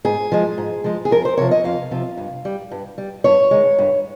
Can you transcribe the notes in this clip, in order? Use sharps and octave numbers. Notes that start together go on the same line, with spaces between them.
G#2 G#4
F3 G#3
G#2
F3 G#3
G#4
F2 A#4
C5
C3 F3 C#5
D#5
F2 F5
C3 F3
G2
G3
G2
G3
G2 C#5
D#3 G#3
G2